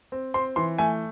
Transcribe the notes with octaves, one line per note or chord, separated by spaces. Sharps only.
C4
C4 C6
E3 C6
A3 G#5